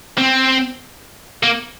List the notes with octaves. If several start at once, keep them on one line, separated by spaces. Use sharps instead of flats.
C4
A#3